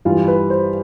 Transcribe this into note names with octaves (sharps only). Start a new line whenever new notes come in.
G2 E3 G3 F4
B4
C5